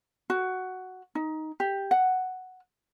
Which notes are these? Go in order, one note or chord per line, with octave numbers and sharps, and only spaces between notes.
F#4
D#4
G4
F#5